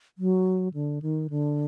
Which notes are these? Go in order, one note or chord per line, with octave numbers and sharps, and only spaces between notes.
F#3
D3
D#3
D3